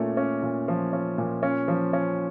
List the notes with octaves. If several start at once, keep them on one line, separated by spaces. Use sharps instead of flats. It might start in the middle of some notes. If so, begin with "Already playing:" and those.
Already playing: A#2 A3 C#4
C#4
A#2
F3
C#4
A#2
C#4
F3
C#4